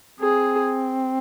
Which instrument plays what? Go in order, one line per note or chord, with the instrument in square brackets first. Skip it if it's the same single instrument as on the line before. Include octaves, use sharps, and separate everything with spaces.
[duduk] C4 [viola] G#4